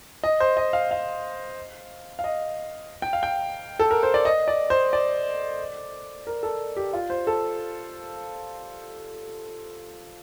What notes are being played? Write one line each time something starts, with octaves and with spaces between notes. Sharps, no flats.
D#5
C5
D#5
F5
F5
F5
D#5
G5
F5
G5
A4
A#4
C5
D5
D#5
D5
C5
D5
A#4
A4
G4
F4
C5
A4